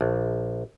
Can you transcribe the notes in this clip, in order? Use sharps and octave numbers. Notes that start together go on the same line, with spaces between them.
A#1